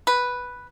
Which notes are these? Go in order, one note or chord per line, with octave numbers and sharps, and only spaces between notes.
B4